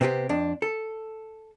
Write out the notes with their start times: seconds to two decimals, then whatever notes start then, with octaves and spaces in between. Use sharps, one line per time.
0.01 C3 B3 C4 F4 G4
0.29 F2 D4
0.62 A4